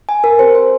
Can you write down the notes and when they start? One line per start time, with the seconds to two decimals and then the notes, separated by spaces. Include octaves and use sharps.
0.09 G#5
0.24 A#4
0.39 C4 G4 C5
0.55 C5